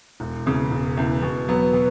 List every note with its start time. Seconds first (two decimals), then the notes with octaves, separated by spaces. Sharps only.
0.20 E1
0.46 E2 C#3
0.71 E1
0.97 E2 C#3
1.22 B2
1.48 F#3 B3
1.73 B2